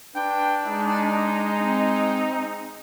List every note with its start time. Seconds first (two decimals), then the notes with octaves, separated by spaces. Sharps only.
0.16 D4 B4 G5
0.66 G#3 D#4
1.60 C4